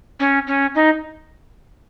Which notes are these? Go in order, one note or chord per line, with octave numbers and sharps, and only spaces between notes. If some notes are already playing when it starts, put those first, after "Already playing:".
C#4
C#4
D#4